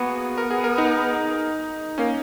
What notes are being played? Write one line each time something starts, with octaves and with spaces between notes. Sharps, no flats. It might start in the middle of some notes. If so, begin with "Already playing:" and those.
Already playing: A#3 B3 F#4 G#4
A#4
G#4
A#4
D#4
A#3 C#4